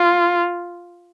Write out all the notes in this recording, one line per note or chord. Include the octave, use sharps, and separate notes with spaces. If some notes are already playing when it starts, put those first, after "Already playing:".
Already playing: F4